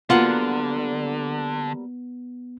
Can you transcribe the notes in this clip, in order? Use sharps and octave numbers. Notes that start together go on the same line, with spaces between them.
D3 F#3 G3 A#3 B3 F4 F#5